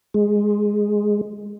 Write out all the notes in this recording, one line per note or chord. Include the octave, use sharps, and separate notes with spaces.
G#3